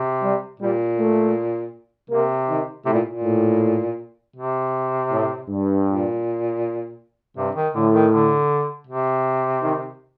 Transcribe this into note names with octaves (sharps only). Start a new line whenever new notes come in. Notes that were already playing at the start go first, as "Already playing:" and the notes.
Already playing: C3
G3
A#2 G3
A3
C3 A#3
D#3
A2 C3
A#2
A#2
A2
C3
A2
G2
A#2
G2 C3
D#3
A2 D3
D#3
D3
C3
D#3